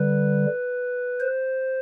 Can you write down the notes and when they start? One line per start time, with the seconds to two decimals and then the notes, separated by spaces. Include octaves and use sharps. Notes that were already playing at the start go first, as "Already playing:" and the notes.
Already playing: D3 G3 B4
1.20 C5